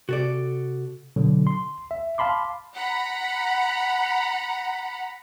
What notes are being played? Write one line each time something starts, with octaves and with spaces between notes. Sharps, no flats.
C3 F#4 A4 D5
B2 D3 F#3
C6
E5
F5 A5 B5 C6 D6
F#5 A#5 B5